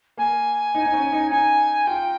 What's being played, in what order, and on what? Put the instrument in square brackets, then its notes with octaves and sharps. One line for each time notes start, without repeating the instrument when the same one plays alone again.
[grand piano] A#3 [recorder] G#5
[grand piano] D#4
D#4
C#4
D#4
[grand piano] D#4 [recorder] G#5
[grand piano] F4 [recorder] G5